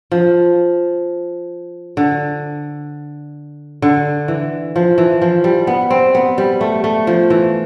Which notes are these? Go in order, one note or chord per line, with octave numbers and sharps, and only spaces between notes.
F3
D3
D3
E3
F3
E3
F3
G3
B3
C4
B3
G3
A3
A3
F3
E3